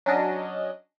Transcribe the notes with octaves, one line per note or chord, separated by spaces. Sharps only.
F#3 C#4 D4 D#5